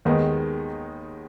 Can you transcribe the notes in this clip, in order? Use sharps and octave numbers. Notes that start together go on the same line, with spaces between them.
D#2 D#3 G#3 B3 D#4